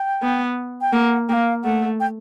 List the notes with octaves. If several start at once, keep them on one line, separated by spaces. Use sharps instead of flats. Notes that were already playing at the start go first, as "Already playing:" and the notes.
Already playing: G5
B3
G5
A#3 F#5
A#3 F5 G5
A3 F#5
G5